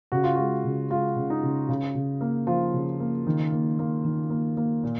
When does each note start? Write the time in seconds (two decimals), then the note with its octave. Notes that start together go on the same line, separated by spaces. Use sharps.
0.12 C#3 F#4
0.24 F4
0.36 G#3 F#4
0.64 C#3
0.90 G#3 F4
1.16 C#3
1.30 D#4
1.43 C#3
1.69 C#3
1.95 C#3
2.21 A#3
2.47 F3 F4
2.74 C#3
3.00 A#3
3.27 D#3
3.53 A#3
3.79 A#3
4.05 D#3
4.30 A#3
4.57 A#3
4.83 A#2